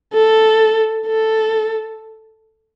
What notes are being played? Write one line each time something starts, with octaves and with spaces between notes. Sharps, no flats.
A4
A4